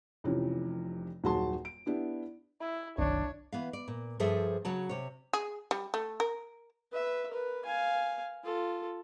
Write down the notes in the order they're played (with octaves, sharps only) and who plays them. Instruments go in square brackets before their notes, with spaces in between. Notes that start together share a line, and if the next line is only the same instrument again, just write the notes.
[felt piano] F1 F2 C3 E3 C#4
D#1 F#2 F#4 G#4 A5 C6
D7
B3 D4 E4 G4
[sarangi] E4
[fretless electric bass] F#1 D#3 [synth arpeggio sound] C2 [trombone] D4 [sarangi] C#5
[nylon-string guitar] E3 B3 F5
D5
A#2
G2 F3 G#4 A4 C5 E5
C#3 F#3 F#4 C#5 A5
C3 C#5
[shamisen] G#4
G3
A3
A#4
[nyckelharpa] B4 E5
A#4 B4
F5 G#5
F4 A4